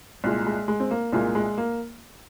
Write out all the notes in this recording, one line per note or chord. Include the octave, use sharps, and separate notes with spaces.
C2 A#2 G#3
G#3
G#3
C4
A#3
C2 A#2 G#3 A#3
G#3
A#3